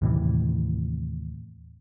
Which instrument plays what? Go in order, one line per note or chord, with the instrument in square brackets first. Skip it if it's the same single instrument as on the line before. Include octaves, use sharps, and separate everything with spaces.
[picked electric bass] D#2 A2 C3 E3